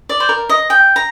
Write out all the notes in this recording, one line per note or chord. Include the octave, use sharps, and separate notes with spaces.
D5
C5
A#4
D#5
G5
A#5